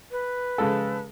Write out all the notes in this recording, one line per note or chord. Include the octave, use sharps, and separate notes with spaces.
B4
C#3 G#3 A4